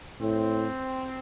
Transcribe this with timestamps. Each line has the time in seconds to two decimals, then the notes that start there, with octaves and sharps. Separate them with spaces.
0.20 A2 C4